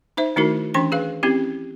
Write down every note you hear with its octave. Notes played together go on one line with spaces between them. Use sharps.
D#4 C5 E5
D#3 A3 D#4 E4 F#4 A#4
E3 C#4 D4 C6
G#4 B4 F5
C4 C#4 E4 G4